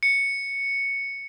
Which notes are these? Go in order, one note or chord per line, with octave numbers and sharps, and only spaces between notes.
C#7